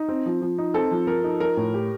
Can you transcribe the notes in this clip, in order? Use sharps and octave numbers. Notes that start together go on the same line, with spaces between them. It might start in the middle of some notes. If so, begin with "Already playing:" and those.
Already playing: D#4
C4
F3
F3
D#4
C4 A4
F3
F3 A#4
D#4
F3 A#4
A2
G4